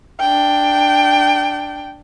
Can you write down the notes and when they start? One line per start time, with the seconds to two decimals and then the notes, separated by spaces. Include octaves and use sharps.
0.20 D4 G5